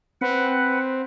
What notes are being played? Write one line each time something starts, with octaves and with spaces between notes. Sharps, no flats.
C4 B4 F#5